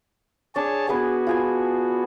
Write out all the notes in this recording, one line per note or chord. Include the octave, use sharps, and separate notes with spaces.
D4 G#4 C#5 A5
B3 F#4 G#4 B4 G#5
F4 G#4 G#5